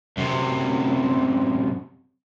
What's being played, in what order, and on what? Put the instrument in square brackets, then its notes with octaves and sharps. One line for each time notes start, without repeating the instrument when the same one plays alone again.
[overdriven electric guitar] F#2 C3